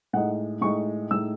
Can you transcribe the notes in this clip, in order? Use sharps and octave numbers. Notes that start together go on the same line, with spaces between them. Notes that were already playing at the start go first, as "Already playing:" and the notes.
A2 G#3 D#4 F#5
A2 G#3 D#4 C#6
A2 G#3 D#4 E6